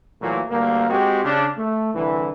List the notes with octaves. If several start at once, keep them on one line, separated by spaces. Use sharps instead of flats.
A#2 E3 F#3 A3 A#3
D2 G2 A#3
G#3 C4 F#4 G4
C#3 D4
A3
C2 D3 E3